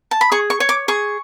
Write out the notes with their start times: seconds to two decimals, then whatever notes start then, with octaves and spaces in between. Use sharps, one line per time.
0.11 A5
0.21 B5
0.32 G#4 C#6
0.50 C#6
0.60 C#5
0.69 D6
0.88 G#4 C#6